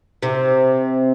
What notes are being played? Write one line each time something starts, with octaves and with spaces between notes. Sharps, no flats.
C3